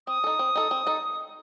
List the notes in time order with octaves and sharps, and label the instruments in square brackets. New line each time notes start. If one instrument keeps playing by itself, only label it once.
[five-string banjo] C4 [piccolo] D#6
[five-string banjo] D#4 A4
C4
D#4 A4
C4
D#4 A4